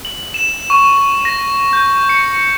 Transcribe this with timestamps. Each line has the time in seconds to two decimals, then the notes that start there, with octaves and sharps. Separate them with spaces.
0.05 F#7
0.34 E7
0.70 C#6
1.25 A#6
1.73 G6
2.09 C#7